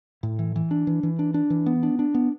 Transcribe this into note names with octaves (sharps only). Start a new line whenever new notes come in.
A2
E3
E3
D4
E3
E3
D4
D4
E3
B3
D4
D4
B3